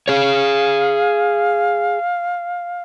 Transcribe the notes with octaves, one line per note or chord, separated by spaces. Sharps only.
G#4 C#5 F5